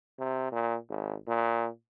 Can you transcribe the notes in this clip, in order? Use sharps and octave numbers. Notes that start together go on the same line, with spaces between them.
C3
A#2
G#1
A#2